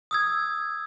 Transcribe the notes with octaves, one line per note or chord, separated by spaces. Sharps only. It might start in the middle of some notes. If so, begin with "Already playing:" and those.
D#6 E6 G#6